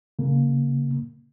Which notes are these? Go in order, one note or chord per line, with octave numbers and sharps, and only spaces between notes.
C#3 A#3